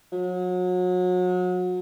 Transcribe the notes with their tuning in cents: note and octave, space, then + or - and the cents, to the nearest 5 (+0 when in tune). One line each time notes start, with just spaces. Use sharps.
F#3 -35